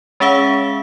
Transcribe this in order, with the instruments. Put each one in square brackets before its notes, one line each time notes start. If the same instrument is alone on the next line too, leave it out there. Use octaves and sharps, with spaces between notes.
[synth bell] G#3 C#4 G#4 E5 F5